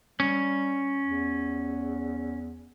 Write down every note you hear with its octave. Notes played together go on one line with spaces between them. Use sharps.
G3 C#4
E2